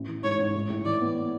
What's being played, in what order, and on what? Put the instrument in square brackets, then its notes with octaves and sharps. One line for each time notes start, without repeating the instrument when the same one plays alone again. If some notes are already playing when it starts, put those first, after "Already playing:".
Already playing: [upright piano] A1
E3
[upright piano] G#2 [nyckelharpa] C#5
[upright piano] G#2
A2
A2
[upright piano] E3 [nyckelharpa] D5
[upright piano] B3